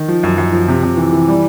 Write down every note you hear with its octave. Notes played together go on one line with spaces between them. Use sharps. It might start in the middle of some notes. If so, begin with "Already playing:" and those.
Already playing: D#3
F3
F#2
F#2
F3
C3
C3
E3
E3
G3